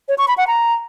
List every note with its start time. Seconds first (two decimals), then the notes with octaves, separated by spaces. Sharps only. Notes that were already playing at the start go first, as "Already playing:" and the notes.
0.08 C#5
0.18 C#6
0.28 B5
0.38 F#5
0.47 A#5